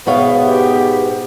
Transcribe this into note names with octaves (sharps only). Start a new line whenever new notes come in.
G#2 B2 B3 C#5 E5 F5
G4